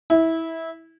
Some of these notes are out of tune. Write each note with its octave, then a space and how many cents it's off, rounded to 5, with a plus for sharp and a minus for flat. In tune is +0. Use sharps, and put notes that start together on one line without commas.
E4 -20